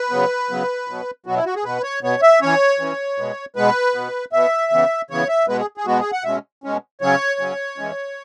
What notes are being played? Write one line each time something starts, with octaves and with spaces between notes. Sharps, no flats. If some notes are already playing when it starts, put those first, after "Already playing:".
Already playing: B4
C#3 F#3 B3
C#3 F#3 B3
B2 F#3 B3
B2 F#3 B3 F#4
E4
F#4
G#4
B2 B3 B4
C#5
B2 B3 C#5
E5
E3 C#4 C#5
E3 C#4
B2 G#3 B3
B2 G#3 B3 B4
B2 B3
B2 B3 E5
C#3 E3 B3
C#3 E3 B3 C#5
E5
B2 G#3 B3 B4
G#4
G#4
B2 G#3 B3 F#4
G#4
F#5
B2 G#3 C#4 E5
B2 G#3 C#4
C#3 F#3 C#4 C#5
C#3 F#3 C#4
E3 G#3 C#4